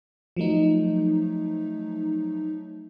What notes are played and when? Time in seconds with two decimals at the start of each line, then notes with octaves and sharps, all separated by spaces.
0.37 F3 F#3 A3 D#4